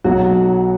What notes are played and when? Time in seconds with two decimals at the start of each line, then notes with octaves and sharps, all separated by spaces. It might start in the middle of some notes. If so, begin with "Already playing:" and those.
0.04 B1 B2 F#3 F#4